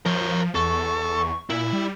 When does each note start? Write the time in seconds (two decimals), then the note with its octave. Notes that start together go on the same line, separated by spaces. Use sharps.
0.06 F3 A#4 C#5
0.55 E2 A4 C#6
1.50 A#2 E4
1.73 G3